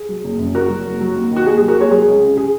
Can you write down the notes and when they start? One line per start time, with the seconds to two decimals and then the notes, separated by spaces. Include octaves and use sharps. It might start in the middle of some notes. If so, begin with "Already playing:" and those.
Already playing: G#4
0.09 F#3
0.24 F#1
0.39 F#2
0.55 F#1 F#4 A#4
0.70 F#3
0.86 F#1
1.01 F#3
1.16 D#2
1.31 D#3
1.36 F#4
1.45 D#2 G#4
1.57 F#3 G#4
1.68 F#4 A#4
1.76 D#2 G#4 C#5
1.91 F#3 G#4
2.07 C#2
2.22 C#3
2.37 G#4